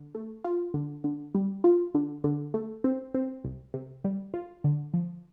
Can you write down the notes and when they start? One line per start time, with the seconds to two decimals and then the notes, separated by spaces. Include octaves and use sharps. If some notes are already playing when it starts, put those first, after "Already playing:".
Already playing: D3
0.15 A3
0.44 F4
0.74 D3
1.04 D3
1.35 G3
1.64 F4
1.94 D3
2.24 D3
2.54 A3
2.84 C4
3.14 C4
3.44 C2
3.74 C3
4.04 G3
4.34 F4
4.64 D3
4.94 F3